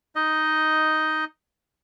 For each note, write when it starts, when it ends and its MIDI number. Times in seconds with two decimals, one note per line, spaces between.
0.16 1.25 63
0.16 1.25 75